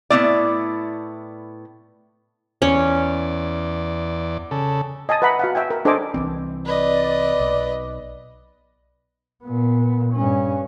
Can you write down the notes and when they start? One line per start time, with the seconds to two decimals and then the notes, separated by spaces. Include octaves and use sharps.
0.10 A2 A#3 B3 E4 D5
2.62 E2 C#4 D5
4.51 C#3 A4
5.09 D#5 G#5 A5 D#6
5.22 B4 E5 F#5 A#5 B5
5.39 F#4 F5 F#5
5.55 E5 G5 G#5
5.70 A#4
5.85 D4 A4 C5 D#5 G#5 D6
6.14 C2 E3 C4
6.65 B4 D5 D#5
7.40 B1
9.43 A#2 B3
10.13 G2 C#4